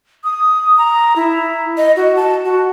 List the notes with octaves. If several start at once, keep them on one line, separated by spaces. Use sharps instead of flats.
D#6
A#5
E4
D#5
F#4
A5
F#4